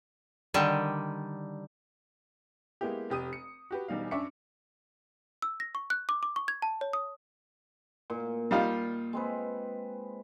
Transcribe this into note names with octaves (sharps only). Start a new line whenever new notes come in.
D3 D#3 G3
G#3 A#3 B3 E4 G4
F1 G4 D#6 D#7
C#7
F#4 G4 B4
E1 E2 G3 D#4 F5
F#2 D4 E5 C#6 D6 C#7
E6
A#6
C#6
F#6
D6
D6
C#6
G#6
A5
C#5
D#6
A#2
G3 D#4 F4
G#3 C4 B4